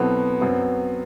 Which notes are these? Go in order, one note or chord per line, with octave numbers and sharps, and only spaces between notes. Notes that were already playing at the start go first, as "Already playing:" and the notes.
Already playing: B2 F#3 B3 C4 E4 A4
F#2 F#3 C4